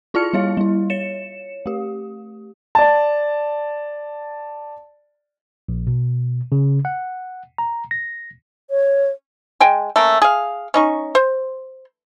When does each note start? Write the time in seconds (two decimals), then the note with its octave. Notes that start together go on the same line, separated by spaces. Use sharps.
0.14 E4 F4 D5 A5 F6 C#7
0.33 G3 E4 C#5 F5
0.57 G3 E4
0.90 C#5 C#7 E7
1.66 A3 G4
2.75 D5 A5
5.69 A#1
5.87 B2
6.52 C#3
6.85 F#5
7.58 A#5
7.91 A#6
8.71 C#5
9.60 G#3 G5 G#5
9.96 A3 A#3 C#4
10.22 G#4 F5
10.74 C#4 D#4 C#6
11.15 C5